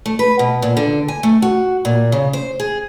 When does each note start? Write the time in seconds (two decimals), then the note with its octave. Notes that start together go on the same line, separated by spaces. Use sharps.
0.06 A3
0.19 B4
0.39 B2
0.62 A#2
0.77 D3
1.08 G#5
1.23 A3
1.42 F#4
1.85 A#2
2.12 C#3
2.33 C5
2.60 G#4